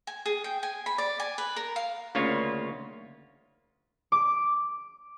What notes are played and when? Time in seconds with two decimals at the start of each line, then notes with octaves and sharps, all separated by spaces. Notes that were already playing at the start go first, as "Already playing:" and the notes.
0.07 G#5
0.26 G#4
0.44 G5
0.63 G#5
0.86 B5
0.98 D5
1.20 G#5
1.38 B4
1.56 A#4
1.76 F5
2.15 D2 C#3 A#3 F4 C#5
4.12 D6